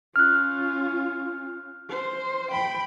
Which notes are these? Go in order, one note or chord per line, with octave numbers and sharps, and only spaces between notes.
C#4 F4 F6 F#6
C5
G5 B5